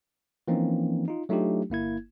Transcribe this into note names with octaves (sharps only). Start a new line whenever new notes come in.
E3 F3 A#3 C4 C#4 D#4
D#4 F4
F#3 A3 D4 D#4 F4 G4
G1 A#3 E4 G#6